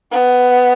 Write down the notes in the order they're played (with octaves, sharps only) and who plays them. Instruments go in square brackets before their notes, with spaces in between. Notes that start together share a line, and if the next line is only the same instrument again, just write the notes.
[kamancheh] B3